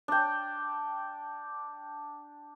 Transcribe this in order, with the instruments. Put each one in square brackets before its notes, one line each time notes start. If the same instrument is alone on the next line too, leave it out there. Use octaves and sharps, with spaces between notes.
[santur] D4 G5